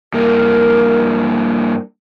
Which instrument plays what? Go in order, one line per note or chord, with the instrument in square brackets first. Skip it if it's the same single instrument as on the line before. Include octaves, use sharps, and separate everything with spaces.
[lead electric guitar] G2 A#3 [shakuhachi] A#4